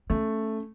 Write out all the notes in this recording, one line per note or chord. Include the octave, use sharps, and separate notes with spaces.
A3 C#4